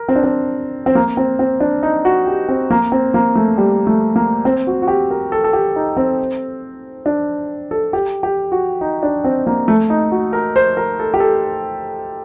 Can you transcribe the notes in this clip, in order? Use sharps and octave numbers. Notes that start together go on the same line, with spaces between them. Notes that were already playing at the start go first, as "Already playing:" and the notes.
Already playing: A#4
C4
D4
C4
C4
A#3
C4
C4
D4
D#4
F#4
G4
C4
A#3
C4
A#3
A3
G3
A3
A#3
C4
F#4
F#4
G4
A#4
A4
A4
G4
D#4
C4
D4
A4
G4
G4
F#4
D#4
D4
C4
A#3
A3
D#4
F#4
A#4
C5
A#4
A4
G4
A4